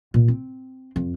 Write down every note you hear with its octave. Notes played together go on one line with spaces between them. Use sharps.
A#2
C4
F2